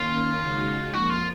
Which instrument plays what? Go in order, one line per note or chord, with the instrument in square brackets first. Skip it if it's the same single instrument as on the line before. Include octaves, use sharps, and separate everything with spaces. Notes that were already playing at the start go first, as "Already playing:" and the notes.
Already playing: [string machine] D#3 A#3 C#4 [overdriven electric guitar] F4
[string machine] C#3 G#3 D#4 F#4
[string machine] F2 F3 A#3 [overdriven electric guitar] F#4
[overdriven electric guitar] F4